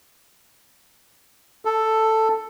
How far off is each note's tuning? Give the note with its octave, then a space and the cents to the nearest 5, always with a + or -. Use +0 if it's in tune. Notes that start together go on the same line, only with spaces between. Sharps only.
A4 +5